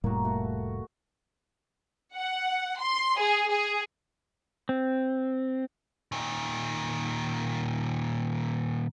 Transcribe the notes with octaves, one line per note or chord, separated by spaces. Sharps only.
F1 A2 G3 A#3 F#4
A3 F#4
F#5
C6
G#4
G#4
C4
A#2 D#3